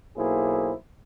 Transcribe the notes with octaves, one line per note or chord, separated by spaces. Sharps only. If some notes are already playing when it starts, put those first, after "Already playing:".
B1 A#3 E4 G#4 C5